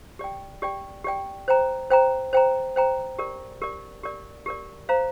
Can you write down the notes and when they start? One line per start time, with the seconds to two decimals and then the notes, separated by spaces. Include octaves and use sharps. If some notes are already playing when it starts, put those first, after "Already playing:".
0.19 G4 D5 G5
0.62 G4 D5 G5
1.04 G4 D5 G5
1.48 C5 G5 A#5
1.90 C5 G5 A#5
2.33 C5 G5 A#5
2.76 C5 G5 A#5
3.19 G4 A#4 D5
3.62 G4 A#4 D5
4.03 G4 A#4 D5
4.46 G4 A#4 D5
4.89 C5 F5 A#5